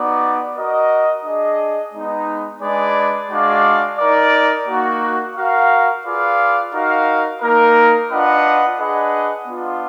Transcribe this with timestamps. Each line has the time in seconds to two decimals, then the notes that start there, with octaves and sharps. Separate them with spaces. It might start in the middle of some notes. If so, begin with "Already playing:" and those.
Already playing: B3 D#4 F#4 D5
0.56 F#4 A#4 D#5
1.24 D4 G#4 D#5
1.94 G#3 B3 D#4
2.62 G#3 D4 G#4 B4 D5
3.30 G#3 D4 F#4 D5 F5
3.99 D#4 A#4 D5
4.67 A#3 D#4 F#4
5.37 F#4 A#4 F5
6.05 F4 G#4 B4 D5 F5
6.73 D#4 F#4 A#4 F5
7.42 A#3 D#4 A#4
8.11 D4 F4 B4 D#5 F#5
8.79 D4 G#4 B4 D#5 F#5
9.48 B3 D4 F4